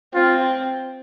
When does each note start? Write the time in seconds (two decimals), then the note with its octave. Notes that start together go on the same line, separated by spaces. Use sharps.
0.15 C4 F4